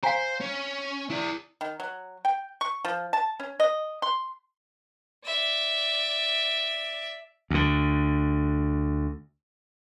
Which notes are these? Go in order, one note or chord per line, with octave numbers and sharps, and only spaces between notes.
C5 F5 G#5 A#5
C#4
E4 D5
D#3
F#3
G5
C#6
F3
A5
C#4
D#5
C6
D5 E5
D2 D3